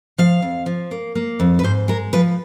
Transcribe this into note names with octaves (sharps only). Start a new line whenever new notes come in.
F3 F5
F2
F3
A#3
A#3
F2
B4
G#2 C5
G#3 A#4
F3 B4